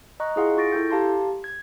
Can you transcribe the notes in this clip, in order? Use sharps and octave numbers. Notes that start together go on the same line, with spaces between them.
D#5 A#5 C#6 F#6
E4 F4 G#4 F5 F#5 C6
F4 C#6 A6 A#6 D7
E4 A4 G5 G6
G4 F5 A5 A#5 C6
G#6